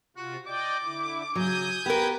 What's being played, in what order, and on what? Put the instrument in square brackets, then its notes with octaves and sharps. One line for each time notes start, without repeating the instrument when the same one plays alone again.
[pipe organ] C3 F4 [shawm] F#4
[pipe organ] D5 D#5 G5 [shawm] D6
[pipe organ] D3 E4
[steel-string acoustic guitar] C#3 F#3 [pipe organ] G#5 D#6 G6
[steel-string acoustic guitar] B3 [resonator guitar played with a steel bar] G4 A#4 [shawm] B4